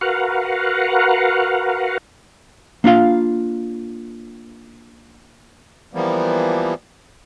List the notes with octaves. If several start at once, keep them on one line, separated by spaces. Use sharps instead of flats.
F#4 A#4 B4 F5 F#5
A#3 D4 F4 F5
E3 F3 G3 A#3 B3